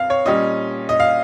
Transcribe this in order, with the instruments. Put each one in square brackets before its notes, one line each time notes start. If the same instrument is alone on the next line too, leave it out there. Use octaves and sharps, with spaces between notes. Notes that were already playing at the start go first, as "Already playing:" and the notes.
Already playing: [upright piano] G2 C4 F5
C#5
A#2 G3 C#4 D#5
D#5
F5